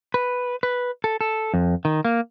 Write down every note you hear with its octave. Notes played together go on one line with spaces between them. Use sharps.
B4
B4
A4
A4
F2
D#3
A#3